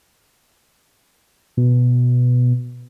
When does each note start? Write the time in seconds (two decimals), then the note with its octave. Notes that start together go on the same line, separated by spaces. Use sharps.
1.57 B2